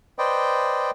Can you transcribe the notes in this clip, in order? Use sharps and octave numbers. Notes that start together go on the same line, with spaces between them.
B4 C5 D5 D#5 G5